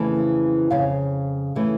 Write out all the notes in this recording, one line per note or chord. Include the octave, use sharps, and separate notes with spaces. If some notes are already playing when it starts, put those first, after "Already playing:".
Already playing: F2 C#3 E3 A3 A5
F2 C#3 F5
C#3 E3 A3